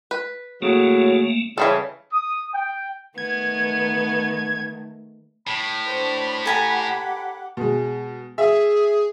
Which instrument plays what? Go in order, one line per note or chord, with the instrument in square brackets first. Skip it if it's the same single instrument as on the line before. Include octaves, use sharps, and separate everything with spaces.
[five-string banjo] B4
[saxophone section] A2 C#3 F#3 [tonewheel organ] A3 A#3
[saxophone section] C#3 [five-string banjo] E3 G3 A4
[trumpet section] D#6
G5
[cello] D#3 A3 [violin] B3 [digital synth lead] G#6
[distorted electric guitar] A2 [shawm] B5
[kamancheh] D4 C5
[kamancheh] G4 F#5 [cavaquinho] A4 G#5 A#5
[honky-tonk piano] B2 G#3
[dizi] G#4 [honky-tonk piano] E5